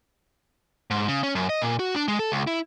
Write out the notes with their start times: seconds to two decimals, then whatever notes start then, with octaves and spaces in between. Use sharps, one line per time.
0.91 G#2
1.08 C#3
1.23 C#4
1.35 F#2
1.49 D#5
1.62 A#2
1.79 F#4
1.95 D4
2.08 G#3
2.19 A4
2.32 C#2
2.47 E4